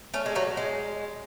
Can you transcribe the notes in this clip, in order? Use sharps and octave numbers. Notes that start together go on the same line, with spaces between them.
A3 C#4
G#3
F#3 A3
G#3